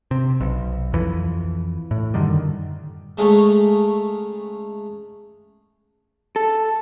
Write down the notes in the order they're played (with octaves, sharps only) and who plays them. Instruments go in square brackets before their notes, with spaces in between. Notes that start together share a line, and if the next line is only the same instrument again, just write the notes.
[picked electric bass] C3
B1
F2 E3
A2
F#2 D3 D#3 G3
[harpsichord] C#3 G#3 A3 C#4 D#4
[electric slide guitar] A4